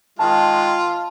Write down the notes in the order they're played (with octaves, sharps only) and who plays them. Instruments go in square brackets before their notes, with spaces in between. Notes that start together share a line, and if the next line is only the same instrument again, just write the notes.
[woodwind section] D#3 G#3 [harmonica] F4 [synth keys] A5